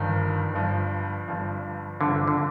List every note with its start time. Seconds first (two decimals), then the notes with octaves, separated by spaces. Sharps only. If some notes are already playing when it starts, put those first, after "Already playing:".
Already playing: G1 G2 D#3 F3
0.54 G1 G2 F3
1.28 G1 G2 F3
2.00 G1 G2 D3 F3
2.28 D3